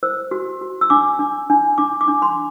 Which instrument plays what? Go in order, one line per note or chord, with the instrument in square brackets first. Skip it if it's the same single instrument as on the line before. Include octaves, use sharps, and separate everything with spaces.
[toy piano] C5 E6
F#4
F#4
E6
D4 D6
D4
D4
D4 D6
D6
D4
C6